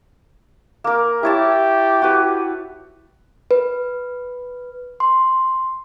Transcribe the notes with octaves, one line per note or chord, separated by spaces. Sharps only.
A#3 A#4
E4 G4 C#5 A5
F#4 B4
B4
C6